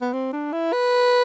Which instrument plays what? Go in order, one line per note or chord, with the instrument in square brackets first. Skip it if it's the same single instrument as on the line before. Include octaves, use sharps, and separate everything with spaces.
[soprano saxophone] B3
C4
D4
E4
B4